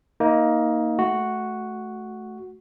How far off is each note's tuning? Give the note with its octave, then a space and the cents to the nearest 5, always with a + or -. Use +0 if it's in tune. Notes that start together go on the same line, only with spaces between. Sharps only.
A#3 +0 D#4 +20
A3 -15 F#4 +0